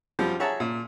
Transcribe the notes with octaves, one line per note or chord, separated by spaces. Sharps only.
F#2 F3 G3
G#4 C#5 E5 F#5 A5 A#5
A#2